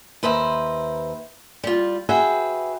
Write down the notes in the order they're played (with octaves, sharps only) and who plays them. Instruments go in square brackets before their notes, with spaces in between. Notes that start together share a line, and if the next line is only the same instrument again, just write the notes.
[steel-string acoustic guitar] D#2 B4 C5 E5 A#5
G3 F4
F#4 G#4 B4 E5 G5